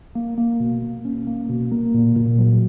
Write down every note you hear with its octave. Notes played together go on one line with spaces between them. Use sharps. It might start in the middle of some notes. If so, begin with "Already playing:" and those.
A#3
A#3
B2
A#3
C#4
A#3
B2
A#3
A#2
A#2
F#3